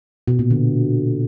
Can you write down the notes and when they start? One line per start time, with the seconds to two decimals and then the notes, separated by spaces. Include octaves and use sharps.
0.28 B2
0.39 A#2
0.50 D3